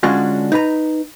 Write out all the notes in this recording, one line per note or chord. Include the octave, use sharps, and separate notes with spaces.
D3 G#3 C#4 D4 F4 F#4
D#4 B4 A#5